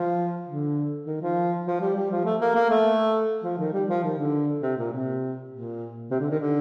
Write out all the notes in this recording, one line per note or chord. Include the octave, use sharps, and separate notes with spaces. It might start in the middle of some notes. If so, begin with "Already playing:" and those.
Already playing: F3
D3
D#3
F3
F3
G3
G3
F3
A3
A#3
A#3
A3
F3
D#3
G3
F3
D#3
D3
C3
A#2
C3
A#2
C3
D3
D#3
D3